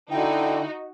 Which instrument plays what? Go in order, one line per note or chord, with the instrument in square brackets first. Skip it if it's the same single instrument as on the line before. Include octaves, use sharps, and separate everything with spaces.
[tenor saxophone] D3 [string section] D#4 F#4 [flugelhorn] E4 [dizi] G5